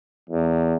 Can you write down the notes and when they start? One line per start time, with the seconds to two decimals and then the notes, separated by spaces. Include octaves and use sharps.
0.30 E2